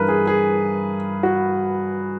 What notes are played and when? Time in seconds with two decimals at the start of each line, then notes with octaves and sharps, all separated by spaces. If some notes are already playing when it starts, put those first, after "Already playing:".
Already playing: G2 E3 A#4 B4
0.08 G#4
0.27 G#4
1.23 F#4